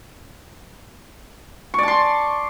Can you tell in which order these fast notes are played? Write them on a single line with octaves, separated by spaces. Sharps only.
C#6 D5 A5 C6